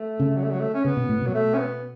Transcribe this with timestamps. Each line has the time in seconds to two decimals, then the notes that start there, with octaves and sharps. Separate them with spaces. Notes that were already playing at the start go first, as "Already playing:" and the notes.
Already playing: A3
0.20 C#3
0.36 F#3
0.43 A3
0.51 F#3
0.60 A3
0.74 C#4
0.85 C#3 B3
0.97 B2
1.09 A2
1.22 B2 F#3
1.34 A3
1.54 C#4
1.58 B3